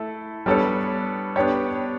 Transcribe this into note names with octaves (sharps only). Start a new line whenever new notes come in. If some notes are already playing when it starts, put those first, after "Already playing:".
Already playing: A3 E4 A4
G3 B3 D4 A4 C#5
B3 D4 G4 C#5